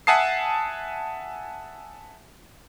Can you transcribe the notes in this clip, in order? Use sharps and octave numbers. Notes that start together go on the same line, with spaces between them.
E5 F#5 G#5 A5 D#6 C7